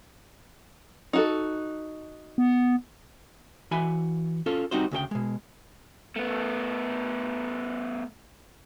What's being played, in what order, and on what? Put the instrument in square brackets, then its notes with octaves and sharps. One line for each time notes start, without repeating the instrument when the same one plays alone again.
[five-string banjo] D#4 F#4 A4
[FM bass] B3
[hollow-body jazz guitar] E3 F#4 G#5 B5
C#4 F4 A4
G3 C4 D#4 F#4 C5
D2 C#3 G#4 G5
B2 G#3
[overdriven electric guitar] A3 B3